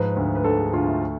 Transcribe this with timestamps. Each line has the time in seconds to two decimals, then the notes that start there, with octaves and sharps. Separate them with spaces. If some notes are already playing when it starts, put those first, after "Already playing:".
Already playing: G#2 F3 B4
0.17 D2
0.35 B4
0.44 D2 A4
0.59 G#4
0.73 D2 F4
0.87 A3